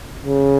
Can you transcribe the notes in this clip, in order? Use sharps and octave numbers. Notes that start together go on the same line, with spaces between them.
C#3